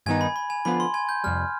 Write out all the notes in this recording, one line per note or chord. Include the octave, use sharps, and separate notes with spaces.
G2 D#3 B3 D#4 G#5 G#6
B5
B5
G#5
D3 F3 B3 F4 B5
C6
G#5 G#6
G6
F2 C3 G3 F6